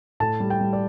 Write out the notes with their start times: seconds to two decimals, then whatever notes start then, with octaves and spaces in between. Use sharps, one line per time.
0.20 A2 A5
0.40 G3
0.50 G5
0.61 G3
0.73 D5